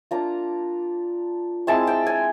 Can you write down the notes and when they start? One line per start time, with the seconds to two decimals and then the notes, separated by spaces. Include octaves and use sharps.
0.11 A#3 D4 F4 A#5
1.67 G#3 C4 E4 A5
1.87 G5
2.07 G#5